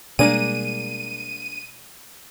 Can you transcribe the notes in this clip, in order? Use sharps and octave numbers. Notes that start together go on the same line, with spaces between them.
B2 G3 G#3 A#3 D4 G#4 D#7